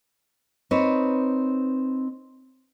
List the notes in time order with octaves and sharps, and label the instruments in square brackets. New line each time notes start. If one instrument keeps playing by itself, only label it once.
[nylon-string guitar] C4 D#4 B4 C#5